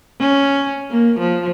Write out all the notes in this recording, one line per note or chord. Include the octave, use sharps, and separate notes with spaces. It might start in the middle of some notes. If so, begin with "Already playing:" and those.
C#4
A#3
F3